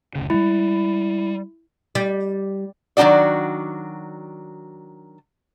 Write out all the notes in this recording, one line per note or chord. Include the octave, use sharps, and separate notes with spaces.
F#1 D2 C#3
G3 G#3 E4
G3
D#3 F#3 A#3 D4 F#4 D5